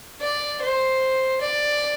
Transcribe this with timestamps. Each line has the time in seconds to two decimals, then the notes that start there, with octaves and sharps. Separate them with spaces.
0.21 D5
0.62 C5
1.41 D5